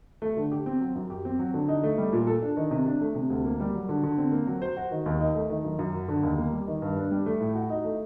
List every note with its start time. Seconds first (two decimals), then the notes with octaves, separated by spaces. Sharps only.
0.22 A3
0.37 D3
0.52 G4
0.66 C4
0.81 F#3
0.95 F#2
1.10 G4
1.25 C4
1.39 F#3
1.54 D3
1.68 D#4
1.83 A3
1.98 G3
2.13 A#2
2.27 A4
2.42 D4
2.57 D#3
2.71 C3
2.86 D4
3.01 A3
3.15 C3
3.30 D2
3.45 A#3
3.60 G3
3.74 F#3
3.89 D3
4.04 D3
4.18 C4
4.32 A#3
4.47 F#3
4.62 C5
4.77 F#4
4.91 D#3
5.06 D#2
5.20 D#4
5.35 A3
5.50 D#3
5.64 F#2
5.79 F#2
5.94 F#3
6.08 D3
6.23 D#2
6.38 A#3
6.53 G3
6.68 D#3
6.82 G2
6.97 D4
7.11 G3
7.26 A3
7.41 A2
7.55 F#4
7.70 D#4
7.84 A3